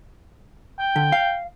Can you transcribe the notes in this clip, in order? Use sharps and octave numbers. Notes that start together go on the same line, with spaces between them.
G5
D3
F5